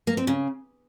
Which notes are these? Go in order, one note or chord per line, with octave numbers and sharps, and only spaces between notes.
A#3
C4
C#3